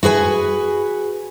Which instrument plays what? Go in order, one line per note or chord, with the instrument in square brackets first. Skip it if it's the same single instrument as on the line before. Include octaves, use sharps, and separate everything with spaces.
[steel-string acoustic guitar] F#4 G#4 B4 G#5